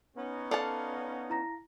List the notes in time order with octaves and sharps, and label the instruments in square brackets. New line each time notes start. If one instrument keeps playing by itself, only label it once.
[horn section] B3 C#4 D#4
[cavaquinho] A4 F5 D#6 [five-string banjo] D5 A5
[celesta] E4 A#5 A#6